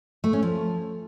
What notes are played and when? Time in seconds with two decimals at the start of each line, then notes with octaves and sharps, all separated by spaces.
0.24 A3
0.33 C#4
0.43 F3